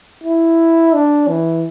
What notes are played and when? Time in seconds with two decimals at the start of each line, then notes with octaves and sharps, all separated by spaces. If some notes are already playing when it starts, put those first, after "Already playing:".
0.24 E4
0.94 D4
1.29 E3